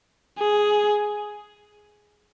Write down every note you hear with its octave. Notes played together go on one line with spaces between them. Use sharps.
G#4